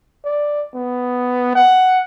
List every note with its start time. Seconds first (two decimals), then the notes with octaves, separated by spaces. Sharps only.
0.25 D5
0.74 B3
1.55 F#5